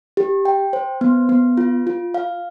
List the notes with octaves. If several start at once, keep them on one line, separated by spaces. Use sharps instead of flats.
G4
G5
C5
B3
B3
F4
F4
F5